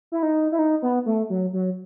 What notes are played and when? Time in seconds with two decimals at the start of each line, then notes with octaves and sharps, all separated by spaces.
0.12 E4
0.23 D#4
0.52 E4
0.59 D#4
0.82 B3
1.06 A3
1.30 F#3
1.53 F#3